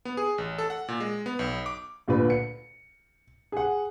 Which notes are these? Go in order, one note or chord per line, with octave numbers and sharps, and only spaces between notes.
B3
G#4
A1
A4
F#5
A#2
G#3
B3
B1
D6
D2 A#2 D3 B4
C#7
G#4 F#5